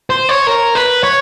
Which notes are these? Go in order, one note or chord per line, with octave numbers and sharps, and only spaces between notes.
C5
C#5
A#4
B4
C#5